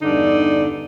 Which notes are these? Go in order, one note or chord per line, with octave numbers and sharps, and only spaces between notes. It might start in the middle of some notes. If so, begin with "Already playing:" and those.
E2 G2 D3 D#4 D5